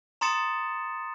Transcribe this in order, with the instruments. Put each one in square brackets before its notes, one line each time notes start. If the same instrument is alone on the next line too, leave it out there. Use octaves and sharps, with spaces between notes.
[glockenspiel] A#5 C6 D#6 A6 C#7 E7